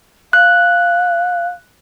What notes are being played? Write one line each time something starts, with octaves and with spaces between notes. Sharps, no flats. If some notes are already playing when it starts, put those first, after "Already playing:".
F5 F#6